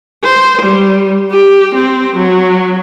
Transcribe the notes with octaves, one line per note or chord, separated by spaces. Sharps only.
C5
G3
G4
C4
F#3